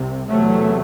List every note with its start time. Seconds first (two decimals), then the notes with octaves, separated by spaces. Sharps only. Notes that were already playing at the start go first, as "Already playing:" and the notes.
Already playing: C2 C3
0.30 E2 C3 F#3 A3